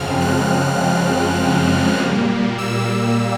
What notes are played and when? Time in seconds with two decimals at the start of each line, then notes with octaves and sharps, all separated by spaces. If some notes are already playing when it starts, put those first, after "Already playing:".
Already playing: F#2 C#3 F3 G#3 C4 F6
0.21 F#6
1.39 F#6
1.98 A#2 G3 A#3
2.58 E6
2.87 E6